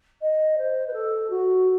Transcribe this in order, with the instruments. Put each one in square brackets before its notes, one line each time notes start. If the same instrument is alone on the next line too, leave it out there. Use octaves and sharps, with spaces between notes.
[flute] D#5
C5
B4
A4
F#4